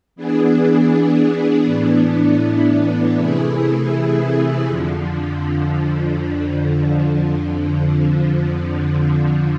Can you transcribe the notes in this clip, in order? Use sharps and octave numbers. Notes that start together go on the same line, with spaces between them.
E3 B3 D4 G#4
A2 E3 B3 D4
C3 E3 A3 E4 G#4
F2 D3 F3